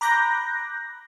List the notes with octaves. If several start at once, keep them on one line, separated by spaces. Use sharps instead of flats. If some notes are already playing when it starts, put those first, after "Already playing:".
A#5 B5 D6 F#6 G6 A#6